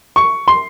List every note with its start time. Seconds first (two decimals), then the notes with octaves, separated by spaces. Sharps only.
0.16 C#6
0.48 C6